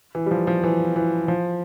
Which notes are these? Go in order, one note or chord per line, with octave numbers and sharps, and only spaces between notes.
E3
G3
F3
F3
E3
E3
F3